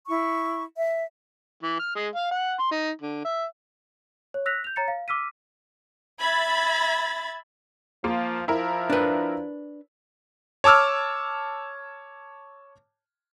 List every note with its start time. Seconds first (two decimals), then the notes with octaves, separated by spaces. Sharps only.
0.07 E4 C#6
0.77 E5
1.62 E3
1.79 F6
1.96 G#3
2.15 F5
2.31 F#5
2.59 C6
2.71 D#4
3.02 D3
3.25 E5
4.34 C#5
4.46 E6 F#6 A#6 B6 F7
4.64 G6 F7
4.76 C#5 A#5 A6 C#7
4.88 F5
5.08 D6 E6 F6 B6 D#7
6.19 E5 B5 G#6 A6
8.04 F3 A#3 F4
8.48 F3 E4 A#4
8.90 D4 B4
10.64 C#5 A5 D6 E6 F6